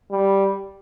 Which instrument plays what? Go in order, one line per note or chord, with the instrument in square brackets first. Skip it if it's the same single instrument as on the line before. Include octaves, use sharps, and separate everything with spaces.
[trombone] G3